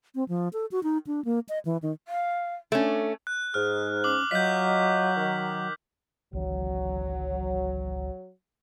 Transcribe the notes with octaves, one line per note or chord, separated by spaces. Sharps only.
C4
F3
A4
F#4
D#4
D4
A#3
D#5
E3
D#3
F5
A3 C#4 D4
F#6
G#2 G#4 F6
C#4 D6 F#7
F#3 F4 C#5 D#5 G6 B6
D#3
G#1 C#2 E3 F#3